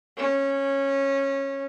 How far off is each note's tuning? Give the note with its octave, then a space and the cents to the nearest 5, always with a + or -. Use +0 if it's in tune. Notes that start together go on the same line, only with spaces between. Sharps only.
C#4 -15